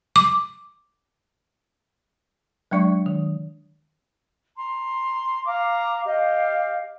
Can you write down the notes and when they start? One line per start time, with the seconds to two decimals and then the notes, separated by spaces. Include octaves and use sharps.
0.16 D6
2.71 F#3 G#3 D4 D5 C#6
3.06 D#3
4.55 A#5 C6
5.45 F5 A#5 D6
6.05 G4 D#5 F5